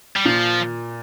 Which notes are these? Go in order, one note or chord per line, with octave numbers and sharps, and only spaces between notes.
G3
A#2 F3